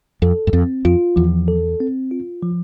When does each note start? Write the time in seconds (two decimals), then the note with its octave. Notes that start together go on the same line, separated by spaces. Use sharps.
0.22 F2 A4
0.47 G2
0.53 F2 C4
0.85 F2 F4
1.16 E2 F3
1.48 A4
1.80 C4
2.11 F4
2.43 F3